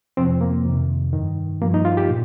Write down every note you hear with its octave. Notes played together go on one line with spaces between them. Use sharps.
F2 C3 F3 C4
A#3
F2 C3 D#3
G2 D#3
G2 F3 A#3
D#4
F4
G4
A#2